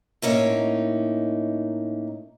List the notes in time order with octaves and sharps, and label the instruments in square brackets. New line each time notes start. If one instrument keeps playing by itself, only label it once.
[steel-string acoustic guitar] A2 A#3 C#4 D#4